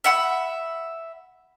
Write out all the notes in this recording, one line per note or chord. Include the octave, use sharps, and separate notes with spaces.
E5 F#5 B5